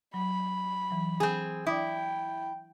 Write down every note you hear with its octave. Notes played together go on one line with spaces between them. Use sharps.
F#3 B5
E3 F#3
C4 G#4
E4 D5 G5 D6 D#6